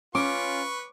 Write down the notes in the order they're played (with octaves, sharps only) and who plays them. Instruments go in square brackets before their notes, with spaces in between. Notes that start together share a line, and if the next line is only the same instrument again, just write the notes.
[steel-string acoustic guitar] C#4 [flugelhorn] F4 [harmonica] B4 C#6 [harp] D6